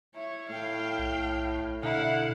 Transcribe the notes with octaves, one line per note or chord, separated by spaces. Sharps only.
E4 C#5
A2 F5 G5
B1
B2 D3 E4 F5 F#5